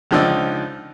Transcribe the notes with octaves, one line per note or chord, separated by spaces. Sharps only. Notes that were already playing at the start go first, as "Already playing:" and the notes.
C#2 D3 F3 D#4 D5 E6